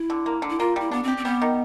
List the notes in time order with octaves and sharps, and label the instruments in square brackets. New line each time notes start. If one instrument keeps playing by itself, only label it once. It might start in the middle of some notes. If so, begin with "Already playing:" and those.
Already playing: [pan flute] E4
[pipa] D3
A#3
D3
[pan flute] E4
[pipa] A#3 [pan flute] F4
[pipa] G3 [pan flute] E4
[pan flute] B3 [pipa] D4
[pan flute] C4 [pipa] G4
[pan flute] C4
[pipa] G3 [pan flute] B3
[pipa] D#3